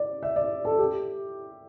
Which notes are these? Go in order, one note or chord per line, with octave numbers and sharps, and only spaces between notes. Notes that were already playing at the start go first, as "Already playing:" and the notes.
Already playing: D5
E5
D5
A4
G4